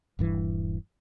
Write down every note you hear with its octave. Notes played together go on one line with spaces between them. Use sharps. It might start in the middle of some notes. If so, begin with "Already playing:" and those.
D#1 G2 E3